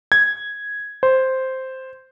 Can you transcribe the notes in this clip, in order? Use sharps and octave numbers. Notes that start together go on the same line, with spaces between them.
G#6
C5